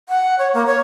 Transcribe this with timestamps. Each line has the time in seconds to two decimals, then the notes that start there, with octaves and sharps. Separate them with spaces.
0.09 F#5
0.39 C#5
0.54 A#3
0.67 C#5